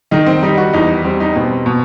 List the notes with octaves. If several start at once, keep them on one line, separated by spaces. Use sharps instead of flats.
D#3 D#4
C4
G3 D#4
F#4
E2 D#4
G3 C4
D#4
B2 C4
B2